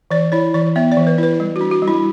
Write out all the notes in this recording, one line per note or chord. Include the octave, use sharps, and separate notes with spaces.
E3 D5
E4 C#5
E3 D5
B3 E5
D5
E3
B4
E4 B4
G3
F#4
D4
F#4
G3
E4